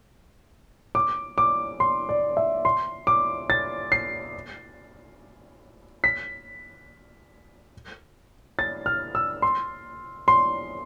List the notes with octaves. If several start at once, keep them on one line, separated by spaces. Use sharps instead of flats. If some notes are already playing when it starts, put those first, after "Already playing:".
D6
D6
C6
D5
E5
C6
D6
A6
C7
B6
A6
F6
E6
C6
C6